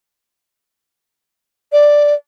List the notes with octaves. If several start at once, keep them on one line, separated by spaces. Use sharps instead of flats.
D5